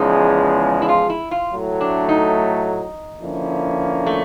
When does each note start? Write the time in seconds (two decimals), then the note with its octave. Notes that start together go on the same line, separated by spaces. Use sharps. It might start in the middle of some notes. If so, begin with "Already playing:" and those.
Already playing: E2 C#3 F3 G#3 D#4
0.82 E4
0.89 F4
1.10 E4
1.31 F4
1.53 A2 F#3 A3
1.81 D4
2.09 D#4
3.22 D3 F3 A#3 C#4 E4
4.07 A3